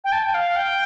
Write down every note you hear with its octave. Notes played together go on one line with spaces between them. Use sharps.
G5
A5
G5
F5
G5